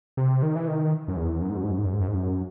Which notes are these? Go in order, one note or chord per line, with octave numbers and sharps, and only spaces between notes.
C3
D#3
E3
D#3
F#2
E2
F#2
G#2
F#2
G#2
F#2
G#2
F#2
G#2
F#2
G#2
F#2